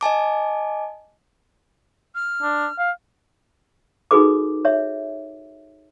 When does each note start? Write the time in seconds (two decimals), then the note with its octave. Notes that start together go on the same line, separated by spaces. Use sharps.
0.01 D#5 G#5 A5 D6
2.15 F6
2.42 D4
2.79 F5
4.11 D#4 F#4 G#4 A4 B4 D6
4.65 C#5 E5